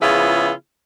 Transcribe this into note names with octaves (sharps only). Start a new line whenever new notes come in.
C#3 F3 B3 E4 F4 G#4